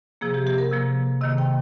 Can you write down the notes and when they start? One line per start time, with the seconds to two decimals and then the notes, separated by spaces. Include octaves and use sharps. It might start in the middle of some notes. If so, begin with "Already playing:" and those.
0.21 C3 F3 A#3 G#4
0.34 G4
0.47 G4
0.58 A#4
0.72 C3 F3 A#3
1.21 C3 D#3 A#3 D#5
1.38 G5